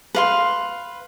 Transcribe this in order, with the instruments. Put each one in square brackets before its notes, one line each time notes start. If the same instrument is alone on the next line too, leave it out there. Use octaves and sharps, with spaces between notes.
[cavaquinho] B4 F5 C6